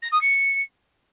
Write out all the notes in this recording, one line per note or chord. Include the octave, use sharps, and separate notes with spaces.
A#6
D#6
C#7